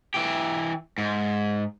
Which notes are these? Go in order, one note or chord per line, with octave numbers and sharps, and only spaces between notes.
E3 G4
G#2